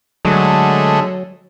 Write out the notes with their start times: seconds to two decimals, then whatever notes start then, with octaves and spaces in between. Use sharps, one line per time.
0.25 D3 F#3 G#3 A3